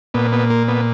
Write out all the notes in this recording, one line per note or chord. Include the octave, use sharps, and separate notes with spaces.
A#2 B3
B3
A#3
B3